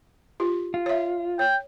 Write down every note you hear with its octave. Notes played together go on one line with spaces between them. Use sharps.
F4 G4
F4
C#5 E5
C#5 G5